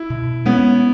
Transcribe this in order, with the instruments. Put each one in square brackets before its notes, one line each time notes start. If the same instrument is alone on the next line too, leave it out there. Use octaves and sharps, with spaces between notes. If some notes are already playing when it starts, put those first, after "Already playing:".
Already playing: [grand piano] E4
[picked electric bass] B2
[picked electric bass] G#3 C#4 [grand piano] B3